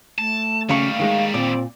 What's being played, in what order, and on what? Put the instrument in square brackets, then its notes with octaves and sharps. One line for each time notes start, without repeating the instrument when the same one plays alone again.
[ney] A3 [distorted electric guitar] A5
[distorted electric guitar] D#2 G3 [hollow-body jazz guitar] C#3 F#3 [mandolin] F5 C#6
[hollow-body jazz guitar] D#3 G#3 D#4
[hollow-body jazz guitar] A#2 [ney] C4 [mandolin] D5